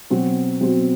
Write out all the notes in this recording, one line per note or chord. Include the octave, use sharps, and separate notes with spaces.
B2 F#3 C4 F#4
B2 F#3 C4 F#4